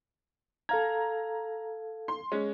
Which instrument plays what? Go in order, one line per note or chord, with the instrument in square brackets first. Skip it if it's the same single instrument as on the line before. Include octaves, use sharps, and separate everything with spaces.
[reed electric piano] A4 F5 G#6 [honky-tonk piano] A#5
[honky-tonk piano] C6
G#3 C#4